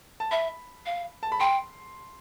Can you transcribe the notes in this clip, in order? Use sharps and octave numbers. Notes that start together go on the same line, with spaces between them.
A5
E5 B5
F5
A5
B5
G5 C6